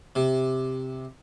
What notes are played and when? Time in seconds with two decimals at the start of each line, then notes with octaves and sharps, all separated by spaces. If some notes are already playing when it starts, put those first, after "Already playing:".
0.16 C3